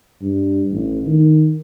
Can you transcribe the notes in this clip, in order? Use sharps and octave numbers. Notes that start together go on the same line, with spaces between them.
G2
A1
D#3